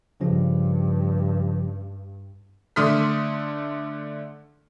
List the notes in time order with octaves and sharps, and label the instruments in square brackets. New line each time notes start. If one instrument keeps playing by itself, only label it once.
[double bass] G2 [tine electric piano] C#3 F3 C#4
[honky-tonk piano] D3 A3 C6 D#6 F6 B6